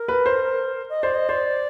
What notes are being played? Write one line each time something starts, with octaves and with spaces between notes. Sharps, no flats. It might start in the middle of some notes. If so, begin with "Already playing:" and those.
Already playing: A#4
B4
C5
D#5
C5 D5
D#5
C5 D5